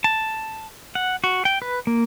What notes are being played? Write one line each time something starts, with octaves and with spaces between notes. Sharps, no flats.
A5
F#5
F#4
G5
B4
A#3